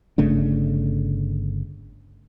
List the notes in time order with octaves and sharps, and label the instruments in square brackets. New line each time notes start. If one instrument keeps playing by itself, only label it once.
[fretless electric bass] G1 C#3 A3 D4